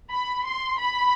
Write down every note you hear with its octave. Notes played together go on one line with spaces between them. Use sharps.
B5
C6
B5